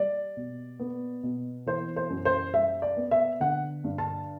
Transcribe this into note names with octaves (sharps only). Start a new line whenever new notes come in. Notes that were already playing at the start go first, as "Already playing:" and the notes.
Already playing: G3 D5
B2
B3
B2
E3 C5
C5
F#2
C5
G3 E5
D5
B3
E5
D3 F#5
G2
A5